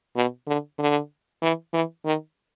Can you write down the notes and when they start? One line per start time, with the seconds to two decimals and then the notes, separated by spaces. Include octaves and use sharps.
0.16 B2
0.47 D3
0.79 D3
1.42 E3
1.73 E3
2.05 D#3